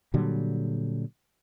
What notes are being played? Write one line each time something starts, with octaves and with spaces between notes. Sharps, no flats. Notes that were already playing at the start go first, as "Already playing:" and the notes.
A#2 D3 F#3 G3